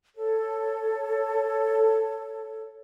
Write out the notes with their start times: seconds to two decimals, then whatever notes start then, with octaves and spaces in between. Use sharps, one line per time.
0.16 A4 C#5